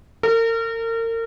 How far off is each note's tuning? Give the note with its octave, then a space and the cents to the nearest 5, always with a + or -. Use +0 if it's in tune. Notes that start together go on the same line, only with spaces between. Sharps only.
A#4 -35